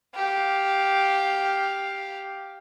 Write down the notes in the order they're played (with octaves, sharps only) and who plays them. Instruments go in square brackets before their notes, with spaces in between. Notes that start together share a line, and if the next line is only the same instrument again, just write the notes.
[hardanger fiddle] G4 F5